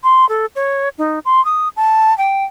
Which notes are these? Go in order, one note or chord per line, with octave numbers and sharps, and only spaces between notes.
C6
A4
C#5
D#4
C6
D#6
A5
G5